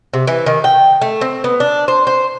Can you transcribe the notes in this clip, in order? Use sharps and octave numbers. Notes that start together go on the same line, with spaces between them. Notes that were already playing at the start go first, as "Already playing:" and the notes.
C3
E3
D#3
G5
A3
C4
B3
D4
C5
C5